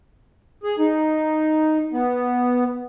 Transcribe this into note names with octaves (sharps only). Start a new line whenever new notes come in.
G#4
D#4
B3